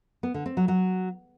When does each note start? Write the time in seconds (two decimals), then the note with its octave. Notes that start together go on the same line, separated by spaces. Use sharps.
0.23 B3
0.34 D3
0.46 C4
0.57 F#3
0.68 F#3